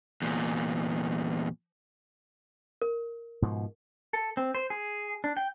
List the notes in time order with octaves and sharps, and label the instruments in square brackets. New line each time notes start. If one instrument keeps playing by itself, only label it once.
[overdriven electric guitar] E2 A#2
[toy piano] A#4
[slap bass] G#2 B2 F3
[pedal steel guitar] A4
C4
C5
G#4
D4
G5